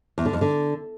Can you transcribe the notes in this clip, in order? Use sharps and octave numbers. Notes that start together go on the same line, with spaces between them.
E2
D3
F2
D3